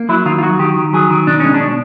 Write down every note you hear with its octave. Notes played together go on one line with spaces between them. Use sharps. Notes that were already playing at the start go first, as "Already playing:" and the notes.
Already playing: A#3
F#3 E4
D#3 F4
F4
F#3 F#4
D#3 G4
D#3
F#3 G#4
D#3
B2 D4
G#3 C#4
D4
B2